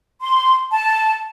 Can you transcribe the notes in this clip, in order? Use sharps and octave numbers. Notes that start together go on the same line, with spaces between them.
C6
A5